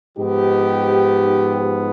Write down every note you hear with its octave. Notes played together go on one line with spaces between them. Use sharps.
G#2 F3 B3 D#4 G4